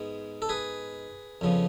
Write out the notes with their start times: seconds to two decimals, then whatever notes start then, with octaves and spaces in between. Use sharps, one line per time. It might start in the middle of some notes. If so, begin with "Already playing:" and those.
Already playing: G#2 G#3 B3
0.42 A4
0.49 G#4 B4
1.41 F2 C#3 F3 B3